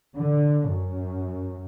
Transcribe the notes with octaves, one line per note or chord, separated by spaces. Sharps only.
D3
F#2